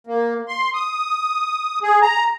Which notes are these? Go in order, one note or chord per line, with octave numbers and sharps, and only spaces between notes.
A#3
C6
D#6
G#4
A#5